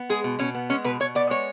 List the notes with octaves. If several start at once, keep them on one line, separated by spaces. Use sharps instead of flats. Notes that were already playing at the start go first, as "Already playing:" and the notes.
Already playing: B3
G#3 G#4
B2
B2 C#4
B3
G#3 C#4
B2 B4
B2 C#5
B3 D5
G#3 C#5